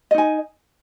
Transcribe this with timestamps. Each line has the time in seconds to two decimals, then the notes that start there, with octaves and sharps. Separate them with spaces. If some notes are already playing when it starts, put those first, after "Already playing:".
0.11 D#5
0.14 D#4
0.18 G#5